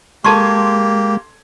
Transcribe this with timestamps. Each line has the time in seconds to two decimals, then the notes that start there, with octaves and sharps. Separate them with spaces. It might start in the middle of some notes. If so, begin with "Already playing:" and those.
0.24 G#3 A#3 G4 A4 A5 C6 C#6 G#6